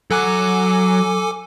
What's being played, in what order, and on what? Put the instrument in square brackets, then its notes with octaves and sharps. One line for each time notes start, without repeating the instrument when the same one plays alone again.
[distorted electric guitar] F#3 F#5 [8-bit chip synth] A4 G#5 D6